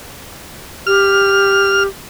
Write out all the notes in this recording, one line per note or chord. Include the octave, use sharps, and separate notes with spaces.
G4 F6